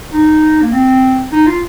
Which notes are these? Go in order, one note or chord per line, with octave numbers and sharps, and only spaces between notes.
D#4
A#3
C4
D#4
F4